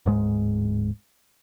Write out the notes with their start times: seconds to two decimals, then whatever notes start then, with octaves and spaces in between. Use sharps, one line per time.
0.06 D1 G#2 G#3